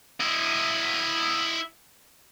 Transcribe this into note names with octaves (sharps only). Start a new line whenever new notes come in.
E4 D#5